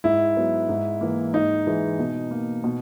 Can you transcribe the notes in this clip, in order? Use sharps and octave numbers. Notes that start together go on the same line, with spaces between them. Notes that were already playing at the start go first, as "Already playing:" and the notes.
G#2 E4
F#3 B3
G#2
E3 A#3
G#2 D#4
E3 G#3
B2
A#3
B2